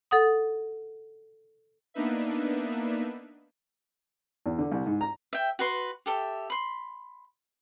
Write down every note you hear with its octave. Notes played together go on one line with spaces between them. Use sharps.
A4 F#5 D#6
A#3 B3 D4 D#4 B4 E5
E2
D3
C2
G#2
A#5
E5 G5
F#4 B4 C6
G4 A4 E5
B5 C6